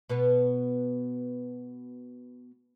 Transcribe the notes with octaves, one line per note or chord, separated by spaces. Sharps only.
B2 B3 B4